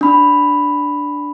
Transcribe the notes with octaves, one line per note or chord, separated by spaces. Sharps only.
D4 B5